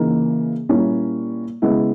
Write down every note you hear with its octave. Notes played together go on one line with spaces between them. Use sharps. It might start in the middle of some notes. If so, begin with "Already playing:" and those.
Already playing: C#3 E3 A#3 D#4
A#2 G3 A#3 C#4 E4
C#3 G#3 B3 E4